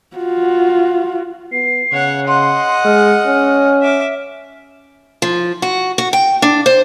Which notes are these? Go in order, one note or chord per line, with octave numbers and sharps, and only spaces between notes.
F4 F#4
B3 C7
C#3 C#5 F#5
D#5 F#5 C6
G#3 F6
C#4
E5 D6
F3
F#4
F#4
G5
D4
C5